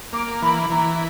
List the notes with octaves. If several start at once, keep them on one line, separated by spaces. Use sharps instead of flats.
A#3 D6
E3 B5
E3 A#5